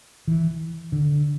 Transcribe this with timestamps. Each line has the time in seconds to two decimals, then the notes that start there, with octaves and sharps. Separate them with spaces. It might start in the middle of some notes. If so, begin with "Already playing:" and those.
0.27 E3
0.92 D3